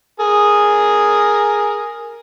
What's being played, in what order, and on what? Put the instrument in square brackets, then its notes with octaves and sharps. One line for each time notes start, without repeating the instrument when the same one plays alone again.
[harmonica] G#4 A#4